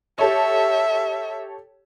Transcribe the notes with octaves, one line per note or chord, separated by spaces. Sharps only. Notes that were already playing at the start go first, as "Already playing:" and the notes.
G4 A4 C#5 E5